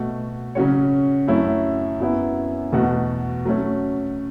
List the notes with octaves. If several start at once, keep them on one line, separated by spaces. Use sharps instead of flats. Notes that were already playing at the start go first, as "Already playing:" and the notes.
Already playing: B2 A3 F#4
C#3 F#3 C#4 F#4 C#5
F#2 F#3 A3 C#4 E4
F#2 F#3 B3 E4
E2 B2 A3 F#4
F#3 A3 C#4